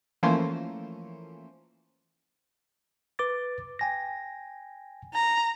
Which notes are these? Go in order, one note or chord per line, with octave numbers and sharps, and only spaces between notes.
E3 F3 A3 A#3 C#4 C5
B4 D6 A6
G5 G#5 A#6
A#5